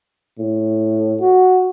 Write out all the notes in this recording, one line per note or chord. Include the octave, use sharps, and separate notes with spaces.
A2
F#4